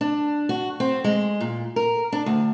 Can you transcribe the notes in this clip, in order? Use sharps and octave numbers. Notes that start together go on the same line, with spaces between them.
D4
F#4
C4
G#3
A#2
A#4
D4
D2